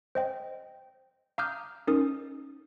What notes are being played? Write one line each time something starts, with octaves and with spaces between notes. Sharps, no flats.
C5 D#5 G5
F5 A#5 D6 D#6 F6 G6
C#4 D#4 A#4 D#6